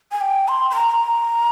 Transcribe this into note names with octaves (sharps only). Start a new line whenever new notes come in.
G#5
G5
C6
C6
A#5